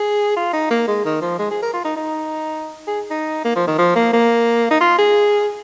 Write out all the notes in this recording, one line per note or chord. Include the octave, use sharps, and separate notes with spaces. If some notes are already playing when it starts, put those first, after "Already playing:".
Already playing: G#4
F4
D#4
A#3
G#3
D#3
F3
G#3
G#4
A#4
F4
D#4
D#4
G#4
D#4
A#3
F3
D#3
F3
A#3
A#3
D#4
F4
G#4